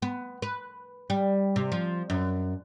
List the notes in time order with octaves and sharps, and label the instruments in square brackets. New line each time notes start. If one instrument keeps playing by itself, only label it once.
[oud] B3
B4
G3
C3
F3
F#2